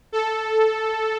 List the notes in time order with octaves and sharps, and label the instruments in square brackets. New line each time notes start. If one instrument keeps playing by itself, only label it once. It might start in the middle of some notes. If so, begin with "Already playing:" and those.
[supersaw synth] A4